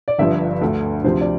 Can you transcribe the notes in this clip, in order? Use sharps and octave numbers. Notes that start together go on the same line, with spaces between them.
D5
G1 G2 F3 E5
D2 D3 A3
D2 C3 F3 C5
D5